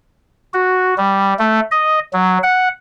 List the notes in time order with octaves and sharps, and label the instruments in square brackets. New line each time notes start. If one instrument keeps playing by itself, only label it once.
[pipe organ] F#4
G3
A3
D#5
F#3
F#5